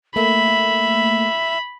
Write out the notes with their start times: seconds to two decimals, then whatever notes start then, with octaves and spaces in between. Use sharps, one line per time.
0.16 A3 A#3 E5 B5